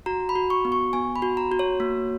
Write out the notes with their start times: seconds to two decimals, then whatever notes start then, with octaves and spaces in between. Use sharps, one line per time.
0.06 F#4 A#5
0.29 B5
0.35 F#4
0.50 C#6
0.65 B3
0.72 C#6
0.93 B3 G#5
1.16 B5
1.22 F#4
1.37 A#5
1.52 F#4
1.59 C#5
1.80 A#3